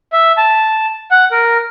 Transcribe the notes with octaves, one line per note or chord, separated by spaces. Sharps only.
E5
A5
F#5
A#4